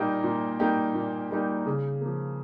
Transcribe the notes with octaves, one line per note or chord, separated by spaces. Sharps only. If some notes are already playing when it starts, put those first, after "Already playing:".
Already playing: A#2 G3 A#3 D#4 G4
A#2
G3 A#3 D#4 G4
A#2
G3 A#3 D#4 G4
C#3
F3 A#3